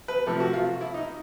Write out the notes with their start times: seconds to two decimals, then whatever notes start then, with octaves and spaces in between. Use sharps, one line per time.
0.08 B4
0.26 C3 F3 A3 A4
0.40 F#4
0.53 F4
0.81 E4
0.94 D#4